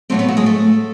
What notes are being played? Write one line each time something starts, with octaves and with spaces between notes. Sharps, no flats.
A2 F#3 A3 C4 C5
B3 B4
F#3 F#4
G#3 G#4
A3 A4